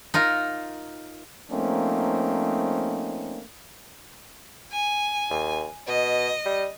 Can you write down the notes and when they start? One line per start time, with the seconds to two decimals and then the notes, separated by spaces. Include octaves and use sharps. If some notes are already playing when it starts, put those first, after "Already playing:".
0.14 D#4 F4 A#4
1.51 F3 A3 A#3 C4 C#4 D#4
4.72 G#5
5.30 D#2
5.88 B2 D#5
6.45 G3